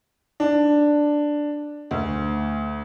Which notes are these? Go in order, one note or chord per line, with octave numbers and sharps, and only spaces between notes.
D4
D2